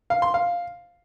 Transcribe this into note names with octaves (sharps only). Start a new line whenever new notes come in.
F5
C6
F5